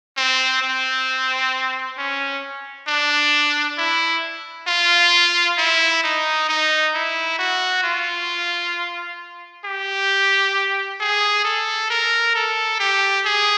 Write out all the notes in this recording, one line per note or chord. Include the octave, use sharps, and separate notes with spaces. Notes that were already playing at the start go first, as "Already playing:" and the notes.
C4
C4
C#4
D4
E4
F4
E4
D#4
D#4
E4
F#4
F4
G4
G#4
A4
A#4
A4
G4
G#4